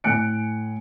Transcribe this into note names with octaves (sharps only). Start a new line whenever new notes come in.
A2 G#5 F#6 C#7 D7